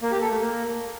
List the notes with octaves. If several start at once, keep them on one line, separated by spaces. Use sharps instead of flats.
A#3
G4
A4
A3
A#3